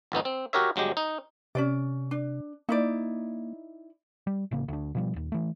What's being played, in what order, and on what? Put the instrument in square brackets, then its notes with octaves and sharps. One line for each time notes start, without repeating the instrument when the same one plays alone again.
[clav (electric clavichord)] G#1 F2 B3 D#4
C4
F#4 G4 A#4 C#5 E5
G1 F#3 G#3 G4
D#4
[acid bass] C3 [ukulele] C#4 D4 D5
[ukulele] D4
[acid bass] A#3 [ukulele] D#4 E4 D5
[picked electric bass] G3
A1 C#3 A#3
D2 D4
B2 F3 G3
D#1 D#2
E3 A3